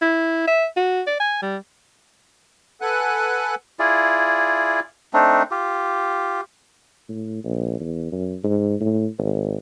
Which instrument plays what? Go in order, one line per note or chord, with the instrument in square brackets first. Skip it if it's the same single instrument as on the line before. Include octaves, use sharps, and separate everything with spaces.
[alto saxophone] E4
E5
F#4
D5
G#5
G3
[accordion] A4 B4 F#5 G#5 F#6
[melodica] E4 F4 G#4 D5
A3 C4 D4 D#4
F4 G4
[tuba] A2
A#1
E2
F#2
G#2
A2
G#1